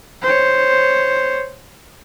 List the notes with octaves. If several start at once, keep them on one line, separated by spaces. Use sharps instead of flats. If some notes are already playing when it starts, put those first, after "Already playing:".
C5 C#5